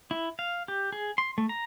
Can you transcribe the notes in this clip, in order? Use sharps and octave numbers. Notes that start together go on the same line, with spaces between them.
E4
F5
G4
G#4
C6
A3
A#5